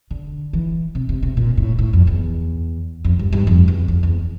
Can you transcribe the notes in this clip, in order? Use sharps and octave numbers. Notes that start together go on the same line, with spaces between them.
D3
E3
C3
C3
C3
A#2
A2
A2
F2
E2
F2
G2
G2
F2
E2
F2
E2